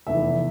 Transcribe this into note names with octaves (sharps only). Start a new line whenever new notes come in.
F1 E2 E3 E5